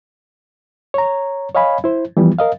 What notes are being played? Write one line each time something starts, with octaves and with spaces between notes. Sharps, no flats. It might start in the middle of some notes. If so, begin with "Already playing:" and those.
C#5 A#5
C#5 D#5 F5 G#5 B5
E4 C5
E3 F3 G3 B3 E4
A#4 D#5 F5